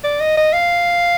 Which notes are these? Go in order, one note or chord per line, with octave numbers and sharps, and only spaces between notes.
D5
D#5
D#5
F5